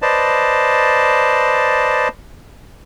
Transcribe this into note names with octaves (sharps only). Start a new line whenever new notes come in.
B4 C5 D5 D#5 A5